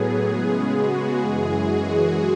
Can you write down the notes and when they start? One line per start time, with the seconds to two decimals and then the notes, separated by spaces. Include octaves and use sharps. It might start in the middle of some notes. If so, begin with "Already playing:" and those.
Already playing: A2 F#3 B3 G#4
0.31 C#3 G#3 B3
0.75 F#4
1.20 F#2 E3 G#3 G#4
1.64 F#4